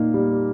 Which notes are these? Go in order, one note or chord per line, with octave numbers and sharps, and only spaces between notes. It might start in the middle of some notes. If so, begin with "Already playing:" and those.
Already playing: A#2 A#3 D#4
G3